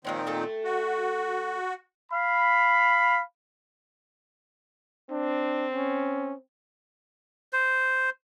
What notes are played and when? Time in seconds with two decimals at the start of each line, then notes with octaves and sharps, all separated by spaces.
0.05 A#2 D#3 F3 G#3 C4 C#4
0.27 A3 A4 G5
0.64 F#4
2.12 F5 B5
5.11 C4 D4
5.74 C#4
7.53 C5